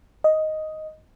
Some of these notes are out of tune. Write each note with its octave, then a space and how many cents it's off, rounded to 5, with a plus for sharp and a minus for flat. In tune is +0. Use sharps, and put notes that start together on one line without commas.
D#5 +5